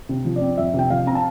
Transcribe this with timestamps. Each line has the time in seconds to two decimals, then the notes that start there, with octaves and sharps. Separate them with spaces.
0.09 C3
0.25 F3
0.36 D5
0.41 C4
0.58 F2 E5
0.74 C3 G5
0.90 F3 F5
1.06 C4 A#5
1.15 A5